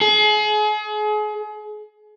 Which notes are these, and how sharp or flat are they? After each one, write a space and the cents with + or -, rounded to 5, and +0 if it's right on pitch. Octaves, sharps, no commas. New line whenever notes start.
G#4 +35